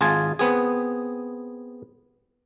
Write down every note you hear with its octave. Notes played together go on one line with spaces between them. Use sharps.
G#1 F4 G#4 G#5 A5
B3 C4 G#4